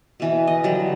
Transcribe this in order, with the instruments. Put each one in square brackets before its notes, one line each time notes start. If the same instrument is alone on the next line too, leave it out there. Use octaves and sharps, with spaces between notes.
[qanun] B2 E3
D#5
D3 F#3 G3